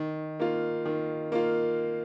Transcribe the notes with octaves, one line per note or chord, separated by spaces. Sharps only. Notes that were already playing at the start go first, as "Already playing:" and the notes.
Already playing: D#3
A#3 F4
D#3
A#3 F4